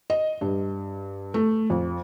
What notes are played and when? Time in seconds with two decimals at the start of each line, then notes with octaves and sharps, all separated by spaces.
0.10 D#5
0.41 G2
1.34 A3
1.70 F2